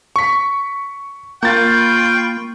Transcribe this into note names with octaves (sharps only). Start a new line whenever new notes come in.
C#6 B6
A#3 F4 G5 B5 C#6 G6 A6